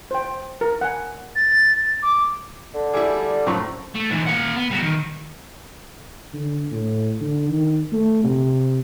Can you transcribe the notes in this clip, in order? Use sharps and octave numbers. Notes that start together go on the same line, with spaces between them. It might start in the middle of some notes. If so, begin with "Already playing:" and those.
C5 G5
A#4
F#5 G#5
A6
D6
D3
G3 E4 G#4
F#2 A2 F3 C#6
A3
G#2 E3
A#3 F#5
B3
G3 F#4
D#3
D3
A2
D3
D#3
A3
C3